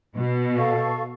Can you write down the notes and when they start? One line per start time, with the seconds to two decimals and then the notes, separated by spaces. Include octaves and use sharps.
0.15 B2
0.57 A4 F5 C#6